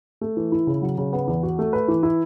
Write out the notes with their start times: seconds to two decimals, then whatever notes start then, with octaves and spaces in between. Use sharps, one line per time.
0.21 A3
0.37 E3
0.52 E4
0.67 C#3
0.82 F#3
0.98 C#3
1.13 B3
1.27 E2
1.43 F#4
1.59 A3
1.73 B4
1.88 E3
2.03 E4